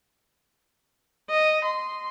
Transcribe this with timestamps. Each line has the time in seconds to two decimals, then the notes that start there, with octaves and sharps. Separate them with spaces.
1.30 D#5
1.65 C6